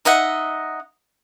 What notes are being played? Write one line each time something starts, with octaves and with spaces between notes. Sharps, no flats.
D#4 D#5 E5 F#5